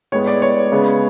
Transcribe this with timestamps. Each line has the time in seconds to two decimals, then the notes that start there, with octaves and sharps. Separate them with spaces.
0.12 A2 G#3 B3 C#5
0.27 D5
0.42 C#5
0.72 C#3 G#3 B3